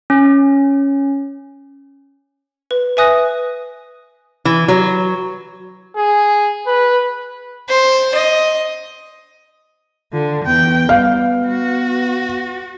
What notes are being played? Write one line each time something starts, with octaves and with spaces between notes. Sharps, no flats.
C#4
B4
B4 E5 G#5 D#6 F#6 A#6
E3
F#3
G#4
B4
C5
D#5
D3 F4
E2 B3 G5
G3 F5
F#4